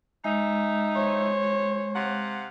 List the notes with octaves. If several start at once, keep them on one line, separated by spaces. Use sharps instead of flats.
G#3 D#4 E5
C5 C#5
C3 F5 F#5